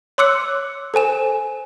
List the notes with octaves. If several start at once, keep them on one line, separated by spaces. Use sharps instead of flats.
C#5 C6 D6 E6 F#6 C#7
A4 C5 G#5 E7